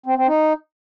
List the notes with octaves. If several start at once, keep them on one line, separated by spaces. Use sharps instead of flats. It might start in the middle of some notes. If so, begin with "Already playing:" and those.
C4
C4
D#4